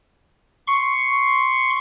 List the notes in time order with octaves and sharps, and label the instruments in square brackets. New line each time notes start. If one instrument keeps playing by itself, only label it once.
[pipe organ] C6 C#6